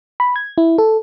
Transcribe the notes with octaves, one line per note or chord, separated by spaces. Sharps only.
B5
G#6
E4
A4